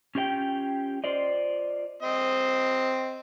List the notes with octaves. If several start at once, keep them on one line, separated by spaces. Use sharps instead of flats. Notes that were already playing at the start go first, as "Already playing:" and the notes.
C#4 F4 G4 D5 G5
F4 C5 D5 D#5
C4 D#5